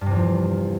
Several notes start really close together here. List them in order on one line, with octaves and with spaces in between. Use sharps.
G2 C3 E2 F3